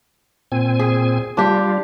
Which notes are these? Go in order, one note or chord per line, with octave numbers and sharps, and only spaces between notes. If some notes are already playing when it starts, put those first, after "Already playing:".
A#2 C4 G#5
G#4
G3 D4 F4 G4